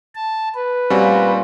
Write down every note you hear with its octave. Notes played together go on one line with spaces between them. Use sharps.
A5
B4
A#2 G3 C4 C#4 F4 F#4